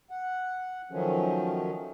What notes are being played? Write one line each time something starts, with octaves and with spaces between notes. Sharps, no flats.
F#5
D#3 F3 F#3 A3 C#4